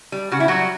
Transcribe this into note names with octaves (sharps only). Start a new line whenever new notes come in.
G3
C#3 F#4
E4
F#3 G3 F#4